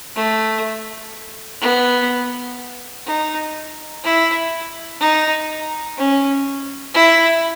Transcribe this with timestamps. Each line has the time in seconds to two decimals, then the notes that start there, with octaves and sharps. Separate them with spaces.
0.15 A3
1.61 B3
3.06 D#4
4.04 E4
5.00 D#4
5.97 C#4
6.94 E4